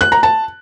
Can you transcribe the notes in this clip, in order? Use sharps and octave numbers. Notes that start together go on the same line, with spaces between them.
F#6
A#5
A5